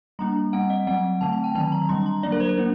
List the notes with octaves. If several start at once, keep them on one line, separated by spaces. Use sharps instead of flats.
G3 A#3 D4 A#5
G3 C4 F#5
D#5
F#3 C4 F#5
D3 A3 C4 A5
A5
G5
D#3 F#3 C4 A5
A#5
D3 G3 D4 C6
A#5
F#3 A#3 D4 D5
A#4
C5
A#4
A#3 D4